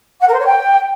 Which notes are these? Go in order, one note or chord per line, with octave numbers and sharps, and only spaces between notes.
F#5
A#4
C5
C#5
G5